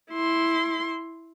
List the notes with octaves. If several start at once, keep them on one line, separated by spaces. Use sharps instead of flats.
E4 C6